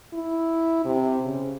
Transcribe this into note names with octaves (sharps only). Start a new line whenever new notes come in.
E4
C3
C#3